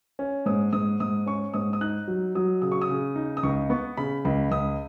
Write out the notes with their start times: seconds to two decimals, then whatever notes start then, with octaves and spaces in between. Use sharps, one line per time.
0.19 C#4
0.46 G#2 D#6
0.73 G#2 D#6
1.00 G#2 D#6
1.26 C#4 C#6
1.54 G#2 D#6
1.73 D#6
1.81 D#4 F#6
2.07 F#3
2.35 F#3 D#6
2.62 C#3 D#6
2.72 C#6
2.82 D#6
2.89 C#3
3.16 D#4
3.37 D#6
3.43 C#2 C#6
3.70 B3 C#6
3.97 C#3 B5
4.25 C#2 B5
4.51 C#2 D#6